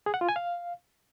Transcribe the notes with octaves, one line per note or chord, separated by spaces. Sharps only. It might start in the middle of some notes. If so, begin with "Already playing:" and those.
G#4
F#5
F4
G#5
F5